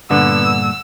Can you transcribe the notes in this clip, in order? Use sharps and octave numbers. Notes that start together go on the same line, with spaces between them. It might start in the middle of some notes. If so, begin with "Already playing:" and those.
G2 A#2 D3 B3 E6